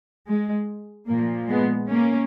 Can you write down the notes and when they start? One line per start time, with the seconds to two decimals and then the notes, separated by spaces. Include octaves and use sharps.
0.26 G#3
1.07 A#2 F3 A#3
1.48 G#3 B3
1.89 A#3 C#4